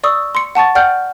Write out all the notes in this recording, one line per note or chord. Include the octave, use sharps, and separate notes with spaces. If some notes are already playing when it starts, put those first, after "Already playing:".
D5 C#6 D#6 E6
C6 C#7
F#5 A5 C#6 A6
D5 F#5 G5 F6 G6